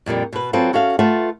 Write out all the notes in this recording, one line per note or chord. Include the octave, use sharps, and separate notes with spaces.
F2 A#2 D3 G3
B2 B4
F#3 C4 F4 A4 B4
C#4 F#4 A4 E5 F5
A3 F4 B4 E5 F#5